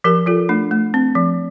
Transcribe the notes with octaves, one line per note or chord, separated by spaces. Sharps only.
F3 G4 A#4
F3 F4 A4
A3 D4
A3
C4
F3